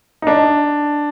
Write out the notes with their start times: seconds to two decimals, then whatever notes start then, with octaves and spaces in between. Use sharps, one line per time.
0.22 D#4
0.27 D4